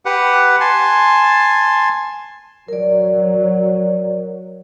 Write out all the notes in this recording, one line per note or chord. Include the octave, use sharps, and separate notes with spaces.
G4 B4 F#5
G#5 A5 C6
F#3 A#4 D5